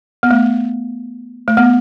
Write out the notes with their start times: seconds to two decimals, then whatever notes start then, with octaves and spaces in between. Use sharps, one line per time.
0.23 B3
0.31 A3
1.48 A3
1.57 B3